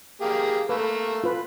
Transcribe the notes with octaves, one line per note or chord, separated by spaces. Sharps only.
A#3 G4 G#4
A3 A#3 B4
F4 B4